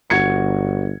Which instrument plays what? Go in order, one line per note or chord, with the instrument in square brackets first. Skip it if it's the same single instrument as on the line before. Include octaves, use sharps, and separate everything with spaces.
[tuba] G1 [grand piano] F#4 G#6 C#7